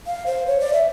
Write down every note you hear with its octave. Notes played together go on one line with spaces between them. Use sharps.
F5
C5
C#5
D5
E5